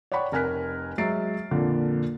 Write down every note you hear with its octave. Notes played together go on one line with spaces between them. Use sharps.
C#5 D5 F#5 G5 B5 C#6
F1 A#4 G#5 F6 F#6 B6
F#3 G#3 E5 A6 C7 D7
F2 A#2 D3